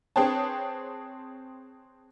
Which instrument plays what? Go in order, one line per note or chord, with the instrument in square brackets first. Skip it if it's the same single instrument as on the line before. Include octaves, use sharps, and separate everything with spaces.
[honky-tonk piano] C4 G#4 B4 C#5 G5 A5